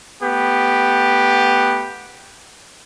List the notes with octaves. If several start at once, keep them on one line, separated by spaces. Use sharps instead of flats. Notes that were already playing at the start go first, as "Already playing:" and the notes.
A3 B3 G4